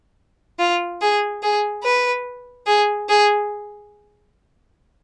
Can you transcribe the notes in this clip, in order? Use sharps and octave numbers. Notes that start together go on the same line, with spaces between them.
F4
G#4
G#4
B4
G#4
G#4